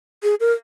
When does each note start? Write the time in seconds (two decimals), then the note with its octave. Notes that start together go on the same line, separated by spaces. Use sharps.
0.23 G#4
0.40 A#4